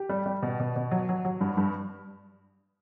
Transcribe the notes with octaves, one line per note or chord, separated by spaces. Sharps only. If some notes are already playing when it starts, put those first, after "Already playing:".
Already playing: G4
G3
G3
B2
B2
B2
F#3
F#3
F#3
G2
G2